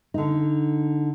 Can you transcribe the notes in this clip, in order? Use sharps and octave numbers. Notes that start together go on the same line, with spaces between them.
D3 D#4